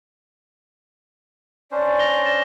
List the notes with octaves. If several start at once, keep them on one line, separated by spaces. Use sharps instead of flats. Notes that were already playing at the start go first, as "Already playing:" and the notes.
C#4 D4 C5 D5
A#6 F7 G7
A#6 E7